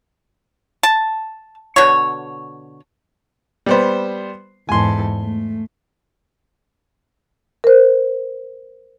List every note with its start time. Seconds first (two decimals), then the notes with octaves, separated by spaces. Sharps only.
0.83 A5
1.76 B2 D3 C#5
3.66 G3 B3 C5
4.69 E2 G#2 A4 G#5 C6
5.20 A3
7.64 A#4 C5